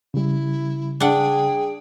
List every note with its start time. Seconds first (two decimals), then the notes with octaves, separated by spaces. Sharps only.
0.14 C#3 G3 E4
1.00 D4 G#4 F#5 G5